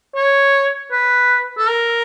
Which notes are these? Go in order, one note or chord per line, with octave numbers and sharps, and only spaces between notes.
C#5
B4
A4
A#4